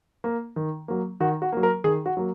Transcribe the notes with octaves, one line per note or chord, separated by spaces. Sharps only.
A#3
D#3
F#3 A#3
D#3 F#4
F#4
F#3 A#3
A#4
D#3 G#4
F#4
F#3 A#3